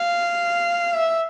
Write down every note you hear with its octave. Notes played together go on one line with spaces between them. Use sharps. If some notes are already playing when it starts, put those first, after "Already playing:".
Already playing: F5
E5